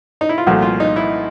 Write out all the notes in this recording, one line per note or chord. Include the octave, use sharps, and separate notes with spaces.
D#4
E4
F4
C2 A#2 F3 A3 F#4
F4
D#4
E4